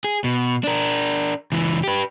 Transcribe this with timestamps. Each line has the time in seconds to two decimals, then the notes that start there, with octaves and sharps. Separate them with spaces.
0.04 G#4
0.24 B2
0.64 D4 A#4
1.52 C#2 E3
1.84 G4 B4